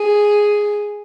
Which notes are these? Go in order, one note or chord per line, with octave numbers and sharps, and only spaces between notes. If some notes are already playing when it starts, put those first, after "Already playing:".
Already playing: G#4